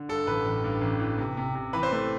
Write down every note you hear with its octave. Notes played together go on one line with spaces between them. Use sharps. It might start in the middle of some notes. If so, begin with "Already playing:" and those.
Already playing: D3
G2 A4
A1 B4
A1
G2
A1
E3
C3
C3
C3
E3 B4
C5
A3 B4